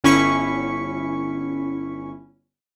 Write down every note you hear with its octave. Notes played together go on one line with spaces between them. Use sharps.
G1 C#4 E4 C#6 B6 C#7